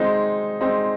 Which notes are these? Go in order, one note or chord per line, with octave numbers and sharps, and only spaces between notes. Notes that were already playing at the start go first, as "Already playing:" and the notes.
Already playing: G#3 C4 D#4
G#3 C4 D#4